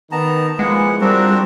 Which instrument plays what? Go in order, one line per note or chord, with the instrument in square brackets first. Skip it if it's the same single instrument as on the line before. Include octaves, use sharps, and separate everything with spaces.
[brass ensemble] D#3 [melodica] B3 A5 A#5
[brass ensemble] F3 A#3 E4 [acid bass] G#3 [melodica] B3 F#5
[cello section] G3 [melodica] C4 D4 F#4 [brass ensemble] F4 A#4 C5